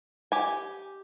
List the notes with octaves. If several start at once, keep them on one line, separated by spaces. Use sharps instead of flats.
G4 G#5